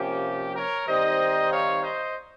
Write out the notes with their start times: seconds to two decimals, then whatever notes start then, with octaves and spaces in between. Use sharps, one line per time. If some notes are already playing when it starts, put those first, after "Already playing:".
Already playing: C3 F3 A#3 C#4 G4
0.55 A#4 C#5
0.87 D#3 G3 C4 D#4 C5 D#5
1.50 C#5 F5
1.82 C5 D#5